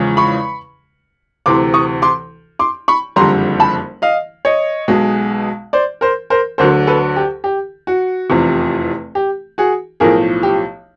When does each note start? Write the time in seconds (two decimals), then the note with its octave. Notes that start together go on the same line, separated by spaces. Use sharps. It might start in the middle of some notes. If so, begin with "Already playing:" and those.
Already playing: E2 C#3 F3 G#3
0.17 B5 C#6
1.46 D2 C3 E3 C6 D6
1.74 C#6 D#6
2.02 C6 D6
2.59 C6 D6
2.88 B5 C#6
3.16 F#1 F2 D3 G3 A#5 C6
3.60 A5 B5
4.02 D#5 F5
4.45 C#5 D#5
4.88 B1 B2 G#3
5.73 C5 D5
6.01 A#4 C5
6.30 A#4 C5
6.58 D2 D3 F#3 A#4 C5
6.87 A4 B4
7.16 G4
7.44 G4
7.87 F#4
8.30 F1 E2 C3 F3
9.15 G4
9.58 F#4 G#4
10.00 B1 A2 F3 G#4 A#4
10.43 G4